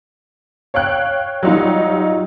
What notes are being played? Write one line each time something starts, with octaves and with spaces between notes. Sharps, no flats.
C#5 F5 G5 F#6
F#3 G3 D#4 F4